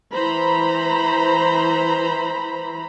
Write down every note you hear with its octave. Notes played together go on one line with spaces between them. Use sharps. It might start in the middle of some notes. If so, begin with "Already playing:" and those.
E3 C5 A#5 B5